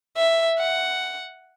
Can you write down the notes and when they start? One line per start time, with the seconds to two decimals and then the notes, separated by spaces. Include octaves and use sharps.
0.16 E5
0.59 F#5